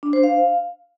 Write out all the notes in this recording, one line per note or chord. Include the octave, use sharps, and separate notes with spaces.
D4
C5
F5